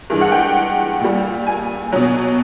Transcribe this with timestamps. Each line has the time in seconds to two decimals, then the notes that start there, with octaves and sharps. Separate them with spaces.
0.10 G2 E3 G#3
0.21 F#5
0.32 G5
1.00 A#2 G3
1.47 G#5
1.92 B2 F#3